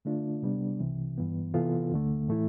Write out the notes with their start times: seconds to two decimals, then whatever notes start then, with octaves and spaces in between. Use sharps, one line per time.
0.05 D3 A3 D4 F4
0.43 C3 G3 B3 D4
0.80 C2 C3 E3
1.18 G2 E3 B3
1.54 C3 E3 B3 F4 A4
1.92 D2 D3 A3
2.28 A2 E3 A3 E4